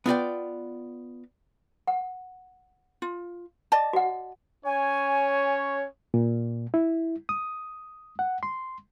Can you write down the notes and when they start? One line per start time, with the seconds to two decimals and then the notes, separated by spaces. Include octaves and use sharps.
0.06 B3 F4 D5 G5
1.87 F#5
3.02 F4
3.72 D5 D#5 A5
3.93 F#4 F#5
4.65 C#4 C#5 G#5
6.14 A#2
6.74 E4
7.29 D#6
8.19 F#5
8.43 C6